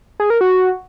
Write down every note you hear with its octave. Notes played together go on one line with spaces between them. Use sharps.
G#4
A#4
F#4